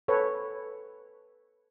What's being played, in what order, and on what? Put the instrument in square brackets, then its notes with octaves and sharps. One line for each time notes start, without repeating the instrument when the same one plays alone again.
[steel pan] A4 B4 C#5